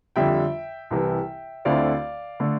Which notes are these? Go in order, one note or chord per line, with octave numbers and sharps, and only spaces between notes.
F2 D3 G3 E5 G5
C2 C3 E3
D2 D3 A3 C4 E4 D5 F5
D3 A3